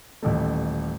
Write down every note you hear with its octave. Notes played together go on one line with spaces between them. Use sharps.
D#1 A1 A3